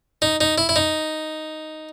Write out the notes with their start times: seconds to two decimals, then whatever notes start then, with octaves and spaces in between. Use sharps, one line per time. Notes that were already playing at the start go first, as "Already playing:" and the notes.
0.22 D#4
0.41 D#4
0.58 E4
0.69 E4
0.76 D#4